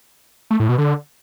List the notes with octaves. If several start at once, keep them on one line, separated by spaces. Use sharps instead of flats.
A3
A2
B2
D3